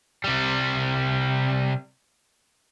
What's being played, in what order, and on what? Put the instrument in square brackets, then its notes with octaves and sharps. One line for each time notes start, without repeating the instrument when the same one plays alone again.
[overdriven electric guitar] C3 G3